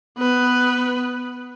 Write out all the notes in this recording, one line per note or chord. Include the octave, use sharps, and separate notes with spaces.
B3 B4